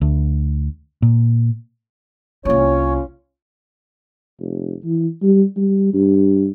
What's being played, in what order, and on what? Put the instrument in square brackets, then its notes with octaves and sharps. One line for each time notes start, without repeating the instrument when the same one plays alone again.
[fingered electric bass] D2
A#2
[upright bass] C2 A#3 [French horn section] C#4 F4 [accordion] C#5
[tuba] F1
E3
G3
G3
G2